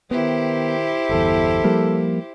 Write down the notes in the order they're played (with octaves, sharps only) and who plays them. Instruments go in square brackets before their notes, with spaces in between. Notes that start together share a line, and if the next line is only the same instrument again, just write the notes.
[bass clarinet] D#3 [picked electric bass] B3 [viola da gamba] E4 G4 C5
[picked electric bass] G1 E2 [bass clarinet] A4
[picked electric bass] F3 G3 A#3